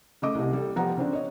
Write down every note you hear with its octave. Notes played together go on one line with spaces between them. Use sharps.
C#3 A3 D#5 D6
C2 C3
G3 A4
F3 G3 B3 F#5 A#5
C#3 C4 D4
C#5 D#5